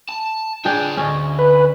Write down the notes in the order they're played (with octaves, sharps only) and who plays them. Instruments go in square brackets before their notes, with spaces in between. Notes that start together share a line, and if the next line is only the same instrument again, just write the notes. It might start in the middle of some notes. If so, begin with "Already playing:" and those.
[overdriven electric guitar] A5
[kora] D4 G#4 G5 [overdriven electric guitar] F4 C#5
[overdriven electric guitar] D2 [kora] C#4 D#5
[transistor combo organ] B4